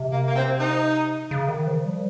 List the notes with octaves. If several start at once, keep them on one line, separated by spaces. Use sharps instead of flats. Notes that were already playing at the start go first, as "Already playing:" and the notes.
Already playing: C3
A#3
A#3
C4
D#4
C#3
D#3
F3
G3